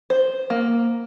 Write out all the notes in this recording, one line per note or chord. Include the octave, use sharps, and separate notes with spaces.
C5
A#3